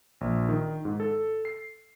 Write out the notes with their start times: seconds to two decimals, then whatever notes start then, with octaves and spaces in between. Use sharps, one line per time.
0.21 A#1
0.49 D#3
0.85 G#2
1.00 A4
1.45 C7